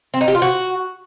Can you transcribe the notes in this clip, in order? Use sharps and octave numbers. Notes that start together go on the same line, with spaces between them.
C4
D#4
G4
F4
F#4